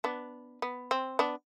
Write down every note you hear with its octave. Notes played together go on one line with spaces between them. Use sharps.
B3 D4
B3
C4
B3 D4